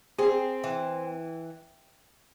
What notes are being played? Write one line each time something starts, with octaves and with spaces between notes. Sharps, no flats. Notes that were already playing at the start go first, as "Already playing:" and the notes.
C4 G#4
E3